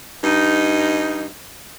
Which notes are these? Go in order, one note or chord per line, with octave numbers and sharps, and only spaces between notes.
G2 D#4